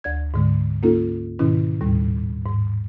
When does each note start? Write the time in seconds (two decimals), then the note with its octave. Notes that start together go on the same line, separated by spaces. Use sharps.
0.04 D2 D5 G#6
0.34 G#2 D3 G#3
0.83 A#3 C#4 D#4 F4 A4
1.39 G#2 B2 D#3 C#4 E4
1.81 D#2 A2 G3
2.46 G#2